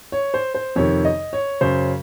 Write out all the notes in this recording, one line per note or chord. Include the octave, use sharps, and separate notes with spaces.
C#5
C5
C5
F2 C3 D#3 C#5
D#5
C#5
F#2 C#3 C5